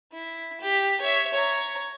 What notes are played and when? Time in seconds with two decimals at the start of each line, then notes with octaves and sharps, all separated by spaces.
0.12 E4
0.60 G4
1.01 C#5 E5
1.33 C#5 A#5